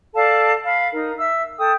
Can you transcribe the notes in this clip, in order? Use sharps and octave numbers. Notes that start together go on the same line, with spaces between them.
A4 D5 F5 A5
F5 B5
D#4 A#4
E5 E6
A4 G5 D#6